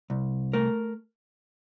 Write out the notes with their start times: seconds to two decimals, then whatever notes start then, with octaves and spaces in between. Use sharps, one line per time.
0.10 C2
0.53 A3 A#4